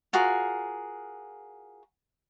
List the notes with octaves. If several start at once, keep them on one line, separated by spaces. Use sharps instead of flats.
F4 F#4 G#4 A#4